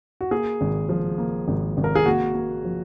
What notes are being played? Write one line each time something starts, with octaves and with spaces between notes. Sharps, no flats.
F#4
A#3 G#4
G#1
F3
A#3
G#1
G#1
A#4
G#4
A#3 F#4
A#3
F3